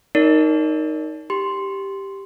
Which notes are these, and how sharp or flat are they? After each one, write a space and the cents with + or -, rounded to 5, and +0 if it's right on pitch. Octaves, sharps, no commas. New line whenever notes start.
D#4 +0 A#4 +0 D5 -45
G4 +0 C6 -5